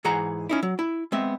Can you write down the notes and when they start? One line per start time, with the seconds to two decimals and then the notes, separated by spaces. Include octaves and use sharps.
0.05 G#2 E3 G#4 F#5 A#5
0.49 C#4 D#4 E4
0.63 F#3
0.79 E4
1.12 G#3 B3 C4 E5